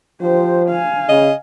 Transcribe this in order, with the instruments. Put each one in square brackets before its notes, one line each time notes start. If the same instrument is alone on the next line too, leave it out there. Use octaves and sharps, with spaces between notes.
[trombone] F3 [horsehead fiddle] G4 C5
[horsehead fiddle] F5 G#5
[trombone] C#3 [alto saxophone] D#5